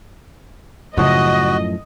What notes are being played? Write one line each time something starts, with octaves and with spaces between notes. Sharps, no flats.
F#2 A2 C#3 F3 F#4 D#5